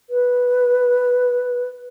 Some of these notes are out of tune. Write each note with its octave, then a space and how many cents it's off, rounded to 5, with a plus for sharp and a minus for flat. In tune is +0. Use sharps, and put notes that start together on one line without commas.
B4 -5